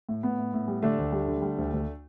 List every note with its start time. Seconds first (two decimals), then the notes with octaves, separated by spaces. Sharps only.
0.09 A2
0.23 A2 B3
0.38 A2
0.53 A2
0.68 G3
0.82 D3 A3 D4
0.98 D2
1.12 G3
1.28 D3
1.42 G3
1.58 D2
1.73 D2